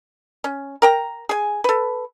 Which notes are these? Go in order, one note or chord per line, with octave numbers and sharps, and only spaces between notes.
C#4
A#4 G5 A#5
G#4 G#5
A4 B4